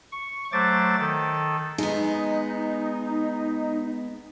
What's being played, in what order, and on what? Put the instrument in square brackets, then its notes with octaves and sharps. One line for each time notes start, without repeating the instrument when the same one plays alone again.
[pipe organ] C#6
F#3 A3 C5 D6 A6
D#3 A4
[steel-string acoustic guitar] G#3 B3 [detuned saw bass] D#4